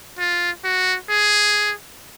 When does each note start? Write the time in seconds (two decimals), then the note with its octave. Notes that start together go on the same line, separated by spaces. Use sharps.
0.19 F4
0.64 F#4
1.09 G#4